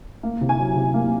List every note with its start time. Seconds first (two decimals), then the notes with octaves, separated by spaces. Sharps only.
0.23 A#3
0.41 C3
0.49 G#5
0.59 F#3
0.75 C3
0.94 A#3